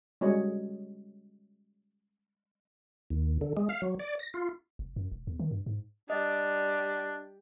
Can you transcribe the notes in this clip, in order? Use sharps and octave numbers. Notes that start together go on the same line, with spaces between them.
G3 G#3 C#4 F#4 C#5 D#5
D#2
D3
G#3
F5
F#3
D5
A#6
F4
F1
F#2
E1
E2
D#3
G2
G#2
G3 D4 D#5